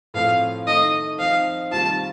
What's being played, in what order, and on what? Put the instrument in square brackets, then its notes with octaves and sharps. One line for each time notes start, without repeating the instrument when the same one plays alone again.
[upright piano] A2 F3 C4 F4 [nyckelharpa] F5
[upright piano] D#3 A3 D#4 [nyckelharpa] D#5
[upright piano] F3 C4 D#4 [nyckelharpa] F5
[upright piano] D#3 G3 C4 F4 [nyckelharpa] A5